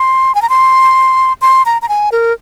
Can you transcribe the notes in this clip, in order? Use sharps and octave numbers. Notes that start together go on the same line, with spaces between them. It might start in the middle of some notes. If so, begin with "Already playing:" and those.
Already playing: C6
G#5
A#5
C6
C6
A#5
A#5
G#5
A#4